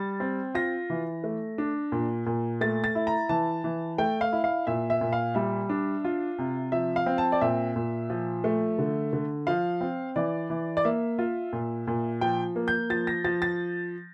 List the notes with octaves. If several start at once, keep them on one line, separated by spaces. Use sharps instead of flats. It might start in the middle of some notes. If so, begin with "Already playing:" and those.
Already playing: G3 A6
C4
F4 A#6
E3
A3
D4
A#2
A#2
A3 A6
A6
E4
A#5
E3 A5
E3
A3 G5
F5
E4
F5
A#2 E5
E5
A#2
F5
G3 E5
D4
F4
C3
F3 E5
F5
C4
A5
D5
A#2 E5
A#2
F3
A3
D3
D3
F3 F5
C4
E3 D5
E3
D5
A#3 E5
F4
A#2
A#2
F3 G5
A#3
G6
F3 A6
A#6
F3 A6
A6